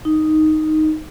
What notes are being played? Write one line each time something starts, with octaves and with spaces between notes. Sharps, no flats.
D#4